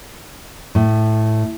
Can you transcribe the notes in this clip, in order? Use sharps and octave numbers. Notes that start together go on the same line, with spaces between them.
A2